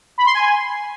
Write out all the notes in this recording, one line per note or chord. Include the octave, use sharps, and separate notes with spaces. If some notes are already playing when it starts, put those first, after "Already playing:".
B5
C6
G#5